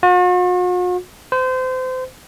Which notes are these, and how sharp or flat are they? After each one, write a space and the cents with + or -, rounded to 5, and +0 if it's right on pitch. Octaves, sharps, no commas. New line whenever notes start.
F#4 -45
C5 -30